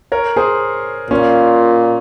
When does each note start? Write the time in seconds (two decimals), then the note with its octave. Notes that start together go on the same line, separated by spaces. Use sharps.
0.12 A#4 C#5
0.36 G#4 C5
1.10 A#2 C#4 F4